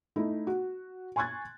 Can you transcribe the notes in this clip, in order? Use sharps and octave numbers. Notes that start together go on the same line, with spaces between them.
A3 D#4 E4
F#4
G#5 C6 C#6 F#6 G#6 A6